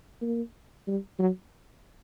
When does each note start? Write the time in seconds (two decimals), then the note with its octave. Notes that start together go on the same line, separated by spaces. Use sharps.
0.21 A#3
0.87 G3
1.19 F#3